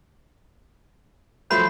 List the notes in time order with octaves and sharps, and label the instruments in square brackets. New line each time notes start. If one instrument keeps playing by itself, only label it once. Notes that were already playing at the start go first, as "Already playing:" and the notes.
[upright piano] F3 F#3 A3 [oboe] C5 [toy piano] B5